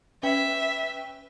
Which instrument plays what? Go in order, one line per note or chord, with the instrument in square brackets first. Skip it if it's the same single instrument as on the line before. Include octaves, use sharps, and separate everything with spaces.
[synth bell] C#4 B4 G5 [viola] E5